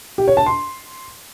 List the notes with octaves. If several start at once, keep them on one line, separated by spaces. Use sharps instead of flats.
G4
C#5
A5
C6